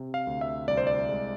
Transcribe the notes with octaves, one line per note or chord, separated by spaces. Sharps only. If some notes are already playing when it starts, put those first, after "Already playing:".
Already playing: C3
F5
D2
E5
C2 D5
C5
D5
G#3